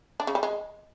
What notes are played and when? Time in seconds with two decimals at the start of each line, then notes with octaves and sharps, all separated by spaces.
0.20 D4
0.27 C#3
0.35 G3
0.43 G#3